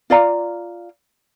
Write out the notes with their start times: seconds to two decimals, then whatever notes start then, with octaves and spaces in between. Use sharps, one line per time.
0.10 F4 D5 F5 A#5